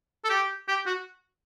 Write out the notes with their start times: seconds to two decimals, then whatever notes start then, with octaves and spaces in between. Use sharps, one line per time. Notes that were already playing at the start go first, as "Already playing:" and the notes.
0.25 A4
0.30 G4
0.68 G4
0.86 F#4